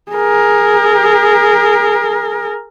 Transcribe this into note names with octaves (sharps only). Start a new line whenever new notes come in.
G#4 A#4